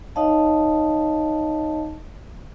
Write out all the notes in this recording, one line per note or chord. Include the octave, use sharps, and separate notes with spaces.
D#4 C#5 D#5 F5 A5